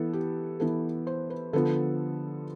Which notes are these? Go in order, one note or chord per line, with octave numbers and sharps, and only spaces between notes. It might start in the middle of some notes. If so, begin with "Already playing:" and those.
Already playing: E3 B3 A4
G4
E3 B3 A4
C5
B4
D3 F3 B3 A4